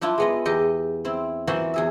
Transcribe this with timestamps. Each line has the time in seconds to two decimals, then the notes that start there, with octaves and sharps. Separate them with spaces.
0.01 F3 D4 E4 F4
0.18 G#3 B3 D#5
0.45 E2 G4 D#5
1.05 C4 E4
1.47 E3 A#3 F#4 C5 E5 C6
1.74 E2 G#4 E5